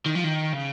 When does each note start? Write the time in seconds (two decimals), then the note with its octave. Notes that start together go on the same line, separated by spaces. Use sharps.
0.06 D#3
0.15 F3
0.24 D#3
0.53 C#3